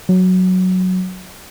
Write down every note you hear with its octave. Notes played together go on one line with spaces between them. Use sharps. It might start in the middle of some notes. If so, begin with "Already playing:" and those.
F#3